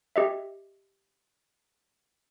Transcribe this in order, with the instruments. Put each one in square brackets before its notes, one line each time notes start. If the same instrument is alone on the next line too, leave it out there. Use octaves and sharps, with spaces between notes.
[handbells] G4 D#5 E5